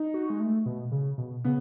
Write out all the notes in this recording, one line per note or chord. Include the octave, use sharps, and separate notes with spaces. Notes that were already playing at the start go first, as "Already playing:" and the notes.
Already playing: D#4
F#4
G#3
A3
B2
C#3
B2
C#3 B3